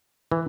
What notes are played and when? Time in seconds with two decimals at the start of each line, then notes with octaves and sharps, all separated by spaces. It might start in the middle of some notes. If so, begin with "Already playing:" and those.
0.32 E3